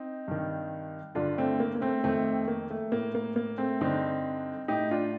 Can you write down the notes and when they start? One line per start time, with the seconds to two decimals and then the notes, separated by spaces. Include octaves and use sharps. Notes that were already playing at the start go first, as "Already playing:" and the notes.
Already playing: C4 D#4
0.28 G2 D#3
1.15 G2 D3 D4 F4
1.38 A3 C4
1.60 A#3
1.75 A#3
1.81 A3 C4
2.04 F2 D#3 A3 C4
2.48 A#3
2.70 A3
2.92 A2 A#3
3.15 A#3
3.36 A#3
3.58 A3 C4
3.81 G2 D3 C4 D#4
4.68 A2 D#4 G4
4.91 D4 F4